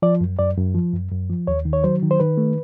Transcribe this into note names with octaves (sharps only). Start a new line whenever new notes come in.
F3 D5
F#2
F#2 D5
F#2
F3
F#2
F#2
F3
D#2 C#5
D#3
C#5
F#3 C5
D#3
C5
D#3 B4
A3